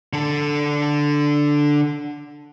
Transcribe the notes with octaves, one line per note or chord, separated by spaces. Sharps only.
D3 A4